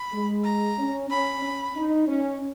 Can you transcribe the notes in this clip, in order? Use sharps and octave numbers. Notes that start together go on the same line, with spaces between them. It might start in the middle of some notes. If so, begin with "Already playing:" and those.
Already playing: B5
G#3
A#5
C#4
C#4 B5
C#4
D#4
C#4